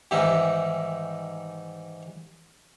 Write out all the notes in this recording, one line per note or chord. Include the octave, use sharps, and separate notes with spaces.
G#2 D#3 E3 G3 D#4 E4